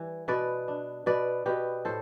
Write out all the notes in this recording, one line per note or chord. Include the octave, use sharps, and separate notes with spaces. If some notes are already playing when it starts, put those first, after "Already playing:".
Already playing: E3 G3
B2 B4 D5
D4
B2 B4 D5
B2 G4 B4
A2 A4 C5